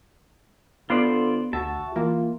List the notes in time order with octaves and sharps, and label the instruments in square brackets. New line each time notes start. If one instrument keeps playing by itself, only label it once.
[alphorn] D3 [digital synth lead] B3 [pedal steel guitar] F4 C5 D5
[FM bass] D2 [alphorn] F#4 [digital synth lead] E5 [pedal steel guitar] A5
[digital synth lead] E3 [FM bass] A#3 [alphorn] F4